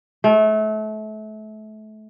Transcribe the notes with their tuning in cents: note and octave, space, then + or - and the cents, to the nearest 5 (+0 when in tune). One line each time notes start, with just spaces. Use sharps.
A3 -30